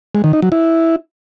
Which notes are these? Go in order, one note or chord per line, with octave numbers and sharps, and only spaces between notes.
G#3
D#3
D#4
F#3
E4